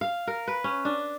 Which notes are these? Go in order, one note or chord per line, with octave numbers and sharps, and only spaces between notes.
F5
A#4
B4
C#4
D4